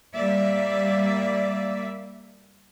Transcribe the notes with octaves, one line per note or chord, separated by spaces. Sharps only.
G3 A#3 D5 E5